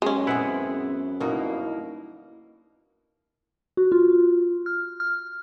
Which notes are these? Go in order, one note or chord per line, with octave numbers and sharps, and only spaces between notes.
F#2 G#3 C#4
B3 C4 E4 G#4 F#5
G1 B2 A#3 D#4 E4
F#4
F4
F6
F6